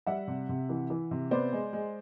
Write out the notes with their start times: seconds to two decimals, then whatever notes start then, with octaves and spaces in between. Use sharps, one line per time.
0.07 G3 E5 F#5
0.28 C3
0.49 C3
0.69 E3
0.90 E3
1.11 C3
1.31 B3 C5 D5
1.53 G#3
1.73 G#3